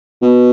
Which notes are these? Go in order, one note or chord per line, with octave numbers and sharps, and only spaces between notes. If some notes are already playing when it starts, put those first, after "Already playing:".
B2